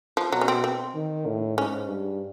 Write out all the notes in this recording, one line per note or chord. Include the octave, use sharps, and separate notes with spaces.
F3
B2 F#3
C#4
C4
C4
D#3
A2
G#2 C#4
G2